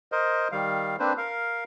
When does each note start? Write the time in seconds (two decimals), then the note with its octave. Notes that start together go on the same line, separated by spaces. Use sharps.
0.12 A#4 C5 D#5
0.52 D#3 G3 F5
0.99 A#3 C4 D4 B4 C5
1.18 A#4 F5